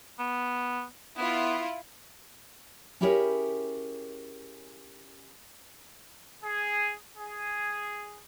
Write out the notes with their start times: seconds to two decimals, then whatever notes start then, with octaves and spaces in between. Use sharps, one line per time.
0.19 B3
1.17 B3 E4 F4
3.01 C#4 E4 G4 G#4 A#4 C#5
6.44 G#4
7.17 G#4